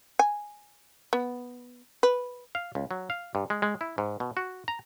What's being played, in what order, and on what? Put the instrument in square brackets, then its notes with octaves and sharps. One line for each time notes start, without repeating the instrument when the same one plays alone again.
[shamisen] G#5
B3
B4
[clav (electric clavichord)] F5
C#2
F#3
F5
G2
G#3
G#3
E4
G#2
B2
F#4
A#5